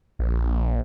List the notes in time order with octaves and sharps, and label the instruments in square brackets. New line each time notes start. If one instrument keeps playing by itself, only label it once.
[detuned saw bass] A#1